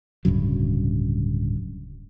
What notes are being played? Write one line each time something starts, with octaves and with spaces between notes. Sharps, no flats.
D1 G2 C#3 F#3